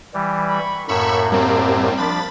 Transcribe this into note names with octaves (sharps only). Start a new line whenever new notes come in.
E3 G3
B5 C#6
F#2 A2 A#3 B5 C#6 E6
G3 C4
F3 D4 B5 A6